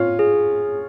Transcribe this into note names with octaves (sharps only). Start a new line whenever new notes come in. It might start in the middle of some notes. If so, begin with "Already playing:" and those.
Already playing: C#4 F4
G#4